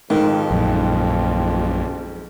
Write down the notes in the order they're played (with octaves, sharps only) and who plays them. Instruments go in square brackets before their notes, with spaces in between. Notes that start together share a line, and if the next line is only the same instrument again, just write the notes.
[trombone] F2 [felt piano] G#2 [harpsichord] D#3
[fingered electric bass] A#1 F#2 A#2